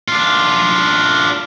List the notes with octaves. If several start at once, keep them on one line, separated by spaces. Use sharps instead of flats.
D4 F4